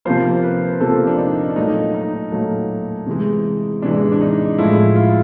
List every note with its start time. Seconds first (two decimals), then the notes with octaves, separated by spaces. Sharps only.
0.05 C3 F3 A#3 C5
0.43 B4
0.81 C3 F3 A#3 A4
1.07 D4
1.18 D#4
1.50 D4
1.56 A#2 F#3 A3 D#4
1.94 D#4
2.32 A#2 F#3 A3
3.07 C3 E3 G#3
3.82 C3 E3 G#3 D4
4.12 D4
4.21 D#4
4.58 A2 F3 G#3 E4
4.96 F4